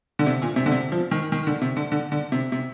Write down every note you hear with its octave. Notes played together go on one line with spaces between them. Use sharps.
D3
C3
A#2
C3
D3
C3
F3
D#3
D#3
D3
C3
D3
D3
D3
C3
C3